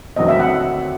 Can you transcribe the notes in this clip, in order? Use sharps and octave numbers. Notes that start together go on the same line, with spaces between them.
D#2 D3 F#3 A3 C4 D#5
E5
F#5